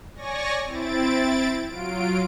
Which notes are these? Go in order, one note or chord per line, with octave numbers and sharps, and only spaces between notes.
C#5 D5 G#5 C#6 A#6
C4 E4 A6 D7
F#3 F4 D7